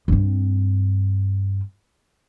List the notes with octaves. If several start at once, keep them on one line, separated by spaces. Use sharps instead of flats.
G2 C4